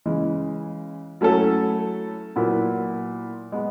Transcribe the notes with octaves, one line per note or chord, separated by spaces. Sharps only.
C#3 E3 G#3
F#3 A3 C#4 E4 A4
A#2 F#3 B3 E4
G#3 B3